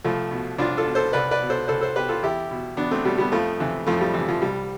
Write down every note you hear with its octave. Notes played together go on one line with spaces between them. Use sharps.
C2 F3 A3
B2
C2 D4 F4
F4 A4
B2
A4 C5
C2 B4 D5
B4 D5
B2
A4 C5
C2 A4 C5
A4 C5
B2 G4 B4
F4 A4
E2 E4 G4
B2
E2 B3 D4
A3 C4
B2 G3 B3
G3 B3
F2 F3 A3
C3 E3
F2 F3 A3
G3
C3 E3
F3
C2 G3